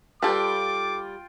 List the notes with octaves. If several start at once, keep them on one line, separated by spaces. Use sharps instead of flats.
G3 F4 A4 B4 G5 D6